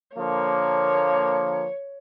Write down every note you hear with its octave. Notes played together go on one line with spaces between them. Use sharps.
D3 F3 A#3 C#5